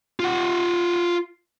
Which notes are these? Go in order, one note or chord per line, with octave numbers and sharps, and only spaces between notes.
F4 F#5